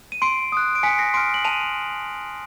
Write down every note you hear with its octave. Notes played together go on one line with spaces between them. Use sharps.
D#7
C6 C7 D7
D#6 F#6
D7
G#5 B6 C#7
A#6 C7
C6 F6 C7 D7
F#7
A5 D#7 F7